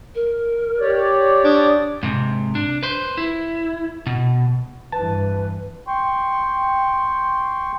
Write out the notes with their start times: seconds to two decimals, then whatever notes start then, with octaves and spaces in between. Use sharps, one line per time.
0.15 A#4
0.80 G4 C#5 D5
1.44 D4 D#6
2.03 G#2 C3
2.55 D4
2.83 B4 C5
3.17 E4
4.07 B2
4.92 G2 E3 B4 A5
5.87 G5 C6 C#6